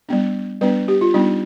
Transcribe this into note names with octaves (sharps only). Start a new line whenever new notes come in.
G3 B3 D4
G3 B3 D4 B4
G4
F4
G3 B3 D4 D#4